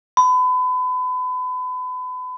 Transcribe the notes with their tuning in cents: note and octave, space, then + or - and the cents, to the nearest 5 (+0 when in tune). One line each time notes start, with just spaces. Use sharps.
B5 +35